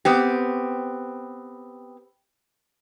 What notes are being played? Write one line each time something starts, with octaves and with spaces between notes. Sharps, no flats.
B3 C4 G4